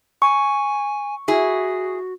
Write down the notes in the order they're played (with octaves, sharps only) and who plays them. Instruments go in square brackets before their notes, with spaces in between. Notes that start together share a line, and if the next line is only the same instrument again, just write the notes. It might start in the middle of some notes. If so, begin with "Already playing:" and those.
[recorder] G#5 [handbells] C#6
[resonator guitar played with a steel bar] E4 G#4 [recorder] F#4